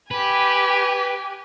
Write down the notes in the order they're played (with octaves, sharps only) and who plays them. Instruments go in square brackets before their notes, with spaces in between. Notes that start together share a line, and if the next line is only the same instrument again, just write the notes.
[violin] G4 G#5 [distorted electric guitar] B4